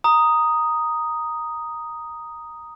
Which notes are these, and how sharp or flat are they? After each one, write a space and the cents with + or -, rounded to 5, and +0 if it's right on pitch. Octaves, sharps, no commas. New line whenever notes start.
A#5 +0 D#6 +0